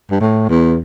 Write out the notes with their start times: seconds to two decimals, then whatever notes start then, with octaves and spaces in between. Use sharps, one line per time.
0.11 G2
0.20 A2
0.49 E2